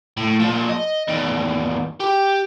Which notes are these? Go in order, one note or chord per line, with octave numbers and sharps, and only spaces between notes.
A2
A#2 F3
D#5
E2 D#3
G4